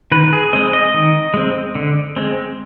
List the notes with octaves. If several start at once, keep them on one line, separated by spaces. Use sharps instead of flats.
D#3 B4
G#4
G#3 C4 D#5
D#5
D#3
G#3 C4
D3
G#3 C4